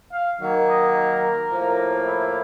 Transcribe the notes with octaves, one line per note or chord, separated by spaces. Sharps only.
F5
D#3 F#3 A#3
D#5
A#4
A2 F3 A#3
E4